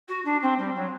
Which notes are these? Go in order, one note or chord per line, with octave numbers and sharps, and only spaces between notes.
F#4
D4
C4
G3
F#3